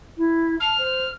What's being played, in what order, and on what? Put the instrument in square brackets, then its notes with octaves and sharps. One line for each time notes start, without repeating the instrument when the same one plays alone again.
[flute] E4
[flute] A5 [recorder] F6
[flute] C5